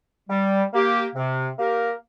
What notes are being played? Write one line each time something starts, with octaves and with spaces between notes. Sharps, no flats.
G3
A#3 G4
C3
A#3 G4 A#4